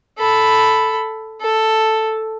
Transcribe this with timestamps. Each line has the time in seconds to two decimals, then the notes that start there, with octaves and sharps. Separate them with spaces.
0.19 A4 B5
1.41 A4